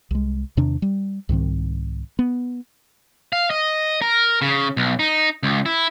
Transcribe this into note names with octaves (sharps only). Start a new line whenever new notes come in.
C2 G#3
E2 C3 D#3 D4
G3
C2 G#2 D#3 C4
B3
F5
D#5
A#4
C#3
B1
D#4
C#2
E4